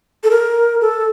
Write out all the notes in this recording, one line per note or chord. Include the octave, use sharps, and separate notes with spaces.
A4
A#4
A4